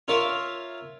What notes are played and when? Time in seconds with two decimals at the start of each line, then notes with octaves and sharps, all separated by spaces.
0.08 F4 A#4 C#5 E5 F5